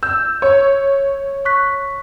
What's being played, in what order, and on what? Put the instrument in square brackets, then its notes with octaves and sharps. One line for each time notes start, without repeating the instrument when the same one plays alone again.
[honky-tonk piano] E6 [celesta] G6
[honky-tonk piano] C#5
[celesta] C#6 F#6 B6